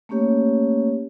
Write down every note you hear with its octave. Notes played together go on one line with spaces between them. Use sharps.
A3 A#3 C#4 G4 C#5